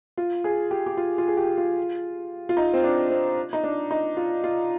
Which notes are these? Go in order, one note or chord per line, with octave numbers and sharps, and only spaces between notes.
F4
G#4
G4
G4
F4
F4
G#4
G4
F4
F4
D#4
C4
D4
C4
D#4
D4
D#4
F4
F4